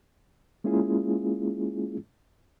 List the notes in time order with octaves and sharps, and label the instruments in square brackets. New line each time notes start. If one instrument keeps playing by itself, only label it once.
[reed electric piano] G#3 A#3 C#4 E4 F4 G#4